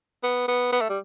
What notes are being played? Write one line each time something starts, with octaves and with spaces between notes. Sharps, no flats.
B3
B3
B3
A3
G3